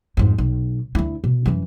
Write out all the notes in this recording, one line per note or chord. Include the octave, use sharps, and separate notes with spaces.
F2 G#2
B1
D2 E4
B2
F#2 E3